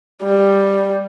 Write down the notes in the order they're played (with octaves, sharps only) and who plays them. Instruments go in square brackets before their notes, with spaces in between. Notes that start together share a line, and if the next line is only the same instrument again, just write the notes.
[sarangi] G3